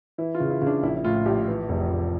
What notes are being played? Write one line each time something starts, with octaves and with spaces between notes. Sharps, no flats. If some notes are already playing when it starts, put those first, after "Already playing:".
E3 E4
F4
C#3
E4
C#3
D4
A#1 E4
E4
A2 F4
A#1 G4
E3
F1
F1